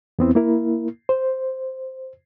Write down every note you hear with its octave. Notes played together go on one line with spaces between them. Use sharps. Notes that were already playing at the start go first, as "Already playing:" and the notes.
E2 B3 C4 E4
A#3 E4 A#4
C5